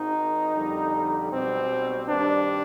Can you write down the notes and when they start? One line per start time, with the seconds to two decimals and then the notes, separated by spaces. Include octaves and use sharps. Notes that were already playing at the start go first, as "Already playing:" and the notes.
Already playing: G#1 G#2 D#3 D#4
0.55 F2 D3 G3
1.31 B1 B2 G3 C4
2.08 G2 D#3 G3 D4